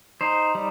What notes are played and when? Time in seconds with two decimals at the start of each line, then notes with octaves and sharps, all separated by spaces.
0.21 D#4 C5
0.55 G3